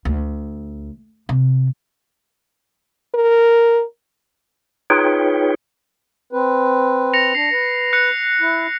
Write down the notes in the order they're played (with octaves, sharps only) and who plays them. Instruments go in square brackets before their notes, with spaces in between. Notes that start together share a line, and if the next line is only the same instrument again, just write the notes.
[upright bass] D2
C3
[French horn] A#4
[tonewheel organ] D#4 F4 G#4 B4 C#5 G5
[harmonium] C4 B4
[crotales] A#6 C#7 F7
[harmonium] D4 [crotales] C7
[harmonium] B4
[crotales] F#6 C#7
[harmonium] E4